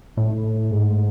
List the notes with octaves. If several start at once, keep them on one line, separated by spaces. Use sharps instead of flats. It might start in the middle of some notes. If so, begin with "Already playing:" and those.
A2
G#2